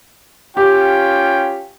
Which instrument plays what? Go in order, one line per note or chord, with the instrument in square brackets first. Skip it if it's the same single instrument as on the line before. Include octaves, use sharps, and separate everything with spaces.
[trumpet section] C#4 F4 G5 [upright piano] G4